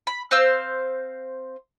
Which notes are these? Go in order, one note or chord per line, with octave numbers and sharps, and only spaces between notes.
B5
C4 C5 F5 E6